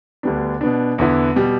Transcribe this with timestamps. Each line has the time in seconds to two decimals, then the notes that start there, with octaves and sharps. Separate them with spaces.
0.23 D2 D3 G3 B3 D4
0.61 B2 B3 D4
0.98 E2 D3 B3 E4
1.36 B2 G3